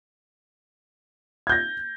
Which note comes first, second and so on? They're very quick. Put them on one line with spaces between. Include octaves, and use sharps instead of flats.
G#6 G6 A#6